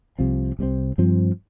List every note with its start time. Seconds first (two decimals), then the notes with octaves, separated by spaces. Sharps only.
0.19 C2 C3 F3 C4
0.59 C2 C3 F3 C4
0.98 G2 F3 C4